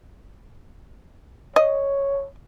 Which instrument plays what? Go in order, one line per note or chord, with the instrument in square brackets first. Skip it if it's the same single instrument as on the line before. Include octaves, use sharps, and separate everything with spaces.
[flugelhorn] C#5 [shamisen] D#5